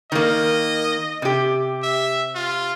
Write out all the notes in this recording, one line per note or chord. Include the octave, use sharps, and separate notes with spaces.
D#3 A#3 D#5
C3 G4
E5
F4